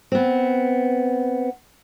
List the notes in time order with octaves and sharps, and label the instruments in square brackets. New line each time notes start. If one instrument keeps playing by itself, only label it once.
[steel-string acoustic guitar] B3 C4